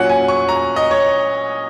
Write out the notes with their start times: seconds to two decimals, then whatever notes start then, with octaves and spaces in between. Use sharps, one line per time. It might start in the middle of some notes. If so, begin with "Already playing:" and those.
Already playing: A#2 F#3 C#4 F#5
0.09 G#5
0.28 C#6
0.49 A#5
0.76 D#5
0.91 C#5